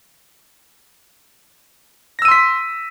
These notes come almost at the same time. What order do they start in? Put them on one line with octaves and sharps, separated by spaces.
A#6 E6 D#7 C6 B6